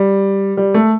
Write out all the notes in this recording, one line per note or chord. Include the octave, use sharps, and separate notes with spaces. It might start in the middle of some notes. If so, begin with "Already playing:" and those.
Already playing: G3
G3
A3